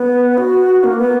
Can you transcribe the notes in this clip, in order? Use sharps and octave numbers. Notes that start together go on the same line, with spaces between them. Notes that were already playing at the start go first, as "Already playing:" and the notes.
Already playing: B3
F#4
A#3
B3